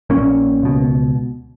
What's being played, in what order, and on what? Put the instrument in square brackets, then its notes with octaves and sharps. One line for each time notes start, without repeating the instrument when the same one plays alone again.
[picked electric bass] A#1 A#2 A#3 C#4
C#2 B2